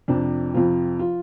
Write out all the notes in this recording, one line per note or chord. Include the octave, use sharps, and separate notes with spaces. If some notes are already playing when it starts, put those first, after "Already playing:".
F2 C3 F3 D4
F2 C3 F3 F4
F3 F4